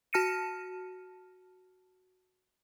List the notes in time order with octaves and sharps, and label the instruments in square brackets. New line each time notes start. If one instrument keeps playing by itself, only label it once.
[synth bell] F#4 A5 F6 A#6 C#7 D#7